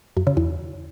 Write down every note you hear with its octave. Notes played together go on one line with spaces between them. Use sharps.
F#2
C#3
E2